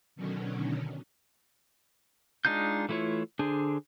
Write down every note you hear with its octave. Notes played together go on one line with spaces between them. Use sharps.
B2 D3 D#3 F#3 C#4
G#3 D4 D#4 F4 G6
E3 A3 E4 F4 C#5
D3 D4 G#4 C5